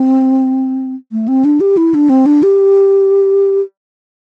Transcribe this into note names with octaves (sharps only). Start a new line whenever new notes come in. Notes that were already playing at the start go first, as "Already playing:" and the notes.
Already playing: C4
A3
C4
D4
G4
E4
D4
C4
D4
G4